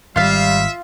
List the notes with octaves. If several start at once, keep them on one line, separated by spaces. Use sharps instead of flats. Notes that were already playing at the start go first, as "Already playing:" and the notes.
G#1 G3 F4 E5 F5